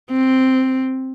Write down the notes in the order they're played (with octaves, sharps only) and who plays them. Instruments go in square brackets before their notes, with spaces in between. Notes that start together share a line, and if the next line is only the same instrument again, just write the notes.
[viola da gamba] C4